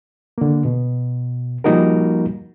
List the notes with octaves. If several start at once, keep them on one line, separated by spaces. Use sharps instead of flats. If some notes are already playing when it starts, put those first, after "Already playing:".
D3 A#3
B2
F3 G3 A#3 D#4 F#4 A#4